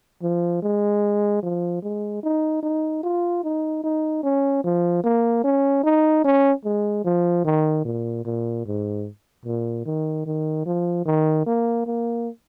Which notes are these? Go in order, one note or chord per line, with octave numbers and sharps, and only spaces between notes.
F3
G#3
F3
G#3
D#4
D#4
F4
D#4
D#4
C#4
F3
A#3
C#4
D#4
C#4
G#3
F3
D#3
A#2
A#2
G#2
A#2
D#3
D#3
F3
D#3
A#3
A#3